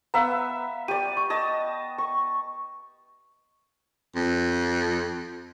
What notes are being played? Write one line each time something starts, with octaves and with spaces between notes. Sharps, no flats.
B3 E5 F5 A#5
G4 D5 D#7
C#6
D#5 A5
C#6
F2